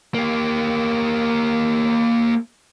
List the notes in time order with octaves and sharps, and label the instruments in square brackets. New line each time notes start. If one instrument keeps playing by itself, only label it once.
[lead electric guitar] A#3 G4